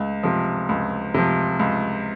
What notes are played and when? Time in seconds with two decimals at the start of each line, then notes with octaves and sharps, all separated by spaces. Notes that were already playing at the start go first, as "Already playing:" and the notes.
Already playing: C#2
0.23 C3 F3
0.69 C#2
1.14 C3 F3
1.60 C#2